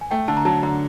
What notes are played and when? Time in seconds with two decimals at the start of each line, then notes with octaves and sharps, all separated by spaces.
0.01 G#5
0.11 A3 G5
0.28 D3 A5
0.37 A#5
0.45 F#3 A5
0.63 D3 A#5